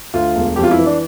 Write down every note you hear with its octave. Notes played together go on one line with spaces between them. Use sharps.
D2 F4
E1
F2 G4
F4
E4
E3
D4